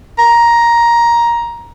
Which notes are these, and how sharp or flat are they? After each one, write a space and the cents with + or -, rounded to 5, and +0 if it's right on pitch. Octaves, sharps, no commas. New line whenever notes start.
A#5 +10